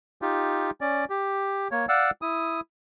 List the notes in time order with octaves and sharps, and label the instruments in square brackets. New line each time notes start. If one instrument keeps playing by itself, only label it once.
[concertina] D#4 F4 G4
C#4 D5
G4
A#3 C#5
D5 F5 F#5 E6
E4 D#6